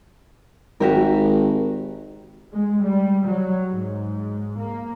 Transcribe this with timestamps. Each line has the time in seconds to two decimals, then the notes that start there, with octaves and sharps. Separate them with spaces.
0.80 G#1 F#4 G4 A#4
2.53 G#3
2.82 G3
3.25 F#3
3.71 G#2
4.59 A#3